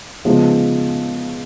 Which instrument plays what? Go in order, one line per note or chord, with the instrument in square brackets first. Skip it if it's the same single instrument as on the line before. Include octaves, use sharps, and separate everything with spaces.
[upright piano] C#3 F3 G#3 B3 D#4